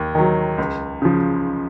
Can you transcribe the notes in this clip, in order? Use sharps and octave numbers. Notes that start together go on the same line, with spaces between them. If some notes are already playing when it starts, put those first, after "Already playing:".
Already playing: D#2
D#3 F#3
C#2
C#3 F3